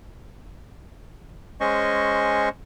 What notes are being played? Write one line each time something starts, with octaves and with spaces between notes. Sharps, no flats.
G#3 C#4 C5 D#5 C#6